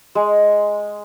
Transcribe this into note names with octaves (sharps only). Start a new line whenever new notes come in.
G#3